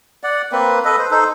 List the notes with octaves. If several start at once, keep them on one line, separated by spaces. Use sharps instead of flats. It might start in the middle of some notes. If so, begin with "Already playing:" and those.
D5 F#5
A#3 C4 B4
A4 B4 D#5
C5
D#4 A4 C5